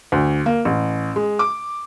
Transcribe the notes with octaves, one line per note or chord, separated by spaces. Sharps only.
D2
A#3
A1
G#3
D6